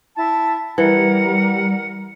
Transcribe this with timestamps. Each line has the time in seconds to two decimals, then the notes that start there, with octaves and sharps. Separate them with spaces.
0.16 E4 A5
0.78 E3 G3 A#4 F#5